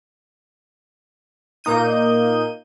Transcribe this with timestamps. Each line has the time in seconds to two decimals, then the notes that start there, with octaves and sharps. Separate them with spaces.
1.64 A#2 A#3 D#4 G6 D#7